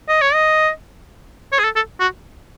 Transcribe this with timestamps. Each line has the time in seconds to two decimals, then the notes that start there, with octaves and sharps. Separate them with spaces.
0.08 D#5
0.21 C#5
0.34 D#5
1.52 C#5
1.59 G#4
1.64 A4
1.76 A4
2.00 F#4